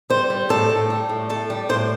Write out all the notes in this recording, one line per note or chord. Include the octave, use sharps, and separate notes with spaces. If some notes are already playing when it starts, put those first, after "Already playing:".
G3 C5
G3
A2 A4
A2
G3
A2
A2 A4
G3
A2 C5